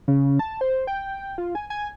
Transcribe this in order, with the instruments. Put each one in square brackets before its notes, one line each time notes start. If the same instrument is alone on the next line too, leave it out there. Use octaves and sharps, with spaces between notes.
[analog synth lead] C#3
A5
C5
G5
F4
G#5
G#5